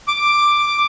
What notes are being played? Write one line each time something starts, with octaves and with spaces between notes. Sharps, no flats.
D6